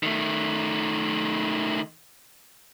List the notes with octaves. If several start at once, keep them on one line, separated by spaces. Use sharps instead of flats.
D#3 A3